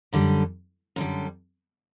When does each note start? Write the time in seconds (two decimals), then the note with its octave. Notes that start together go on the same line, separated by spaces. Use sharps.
0.13 F#2 D3 G3
0.96 F#2 D3 G3